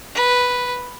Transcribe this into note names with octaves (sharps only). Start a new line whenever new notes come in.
B4